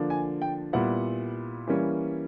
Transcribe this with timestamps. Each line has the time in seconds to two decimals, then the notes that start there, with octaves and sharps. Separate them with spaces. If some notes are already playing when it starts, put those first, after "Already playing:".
Already playing: D3 F3 A#3 D4
0.10 G#5
0.42 G5
0.73 A#2 G3 B3 E4 F#5
1.67 E3 G3 A#3 C#4